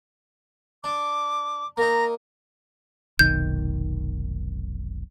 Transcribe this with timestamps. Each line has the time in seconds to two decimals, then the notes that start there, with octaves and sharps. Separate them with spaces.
0.84 D4 D6
1.77 A#3 D#4 A#5
3.19 F1 B1 D#3 G6